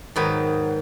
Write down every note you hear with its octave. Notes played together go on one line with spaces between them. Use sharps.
G#2 D#3 F#3 B4